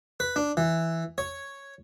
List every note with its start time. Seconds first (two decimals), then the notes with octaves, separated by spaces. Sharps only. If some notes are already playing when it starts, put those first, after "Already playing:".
0.20 B4
0.36 D4
0.57 E3
1.18 C#5